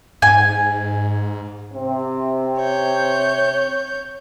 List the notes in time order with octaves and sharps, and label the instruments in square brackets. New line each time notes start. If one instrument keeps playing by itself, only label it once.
[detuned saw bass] G#2 [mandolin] G#5
[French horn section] C3 C4
[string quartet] C#5 G6